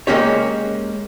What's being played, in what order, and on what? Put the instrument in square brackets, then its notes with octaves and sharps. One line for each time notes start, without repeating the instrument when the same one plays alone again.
[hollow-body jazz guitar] G#3 A#3 C#4 G4 C#5